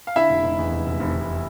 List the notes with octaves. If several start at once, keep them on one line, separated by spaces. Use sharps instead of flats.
F5
D3 E4 E5
F1
F1
E2
F1
F1
F1
F1